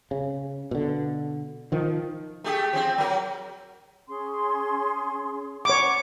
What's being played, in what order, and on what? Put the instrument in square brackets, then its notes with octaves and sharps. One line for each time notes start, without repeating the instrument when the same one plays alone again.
[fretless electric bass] C#3
B2 D3
D#3 F3
[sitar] A3 G4 G#4
F3 C4
F#3 A#4
[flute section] C#4 G#4 C6
[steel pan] C#5 D6 [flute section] D5 F#5 B5